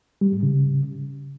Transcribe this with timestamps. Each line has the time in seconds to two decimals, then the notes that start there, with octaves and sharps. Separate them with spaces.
0.21 G3
0.32 G#2
0.43 C#3